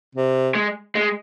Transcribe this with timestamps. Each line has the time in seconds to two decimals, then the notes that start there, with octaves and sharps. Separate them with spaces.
0.15 C3
0.55 G#3
0.95 G#3